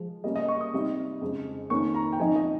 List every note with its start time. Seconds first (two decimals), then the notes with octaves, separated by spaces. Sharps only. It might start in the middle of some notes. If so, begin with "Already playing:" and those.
Already playing: F3 G#3
0.24 C#3 G3 A#3 C#4 D#5
0.36 D#5
0.48 C#6
0.61 D#6
0.73 C3 G3 C4 D#4
1.22 F2 C#3 G#3
1.70 F2 D#3 A#3 C#4 C#6
1.94 A#5
2.13 G5
2.19 G#2 F3 C4 D#4 G#5
2.36 D#5